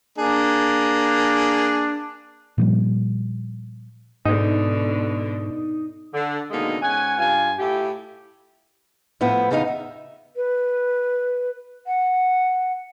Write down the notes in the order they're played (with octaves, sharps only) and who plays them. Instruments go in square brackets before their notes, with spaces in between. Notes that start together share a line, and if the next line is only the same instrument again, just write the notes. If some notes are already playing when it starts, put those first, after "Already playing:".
[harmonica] A#3 G#4 [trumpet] D4
[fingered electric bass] A#2 F3 G3
[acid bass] G#2 [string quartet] B2 D3 [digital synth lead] D#4
[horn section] D3
B2 D3 D#3 G#3 A#3 D#4
G#2 C#4 F#5 G#5
G2 F4 G#5
A2 E4 F4 G4
[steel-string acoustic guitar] A2 F3 B3 E4
E2 C#3 B3 D#4 A#4 F5
E5
[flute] B4
F#5